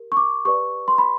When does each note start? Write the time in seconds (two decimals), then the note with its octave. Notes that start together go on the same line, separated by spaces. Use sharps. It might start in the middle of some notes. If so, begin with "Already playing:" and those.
Already playing: G4 A#4
0.12 C#6
0.17 D6
0.45 G4 B4 D5 C#6
0.88 C6
0.98 B5